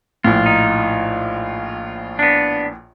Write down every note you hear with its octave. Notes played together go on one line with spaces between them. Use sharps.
A#1 A2 F4
D#4
B3 D4